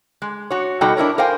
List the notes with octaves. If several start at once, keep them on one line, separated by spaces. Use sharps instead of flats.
G#3
F#4 C#5
B2 G3 D#4 F#4 A4 G5
D4 E4 A#4 C#5
A#4 C5 F5 G5 G#5